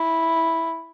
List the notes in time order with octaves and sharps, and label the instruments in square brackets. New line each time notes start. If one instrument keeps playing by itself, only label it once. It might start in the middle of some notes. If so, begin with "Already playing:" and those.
Already playing: [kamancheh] E4